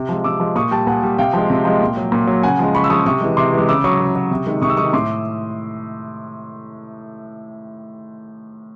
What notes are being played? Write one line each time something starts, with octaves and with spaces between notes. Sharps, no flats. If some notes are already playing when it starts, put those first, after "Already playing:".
Already playing: C3 E6
F3 G#3
C3 D6 E6
F3 G#3
A#2 C#6 D#6
G3 G5 A5
A#2 F#5 G#5
G3
C3 F5 G5
F3 G#3
C3
F3 G#3
A#2
F#3
A#2
F#3
C#3 F#5 G#5
F3 G#3
C#3 B5 C#6
E6
F3 G#3 C#6 D#6
C3 C#6 D#6
E3 G#3
C3 C6 D6
E3 G#3
C#3 D6 E6
F#3 C#6 D#6
C#3
F#3
C3
D#3 G#3
C3 C#6 D#6
E6
D#3 G#3 C#6 D#6
A2 C6 D6